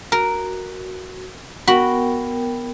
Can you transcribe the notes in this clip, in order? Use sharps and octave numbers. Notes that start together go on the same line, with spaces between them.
F#4 A#4
B3 F#4 A#4 G5 B5